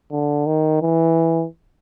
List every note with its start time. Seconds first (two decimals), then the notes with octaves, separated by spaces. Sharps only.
0.11 D3
0.46 D#3
0.82 E3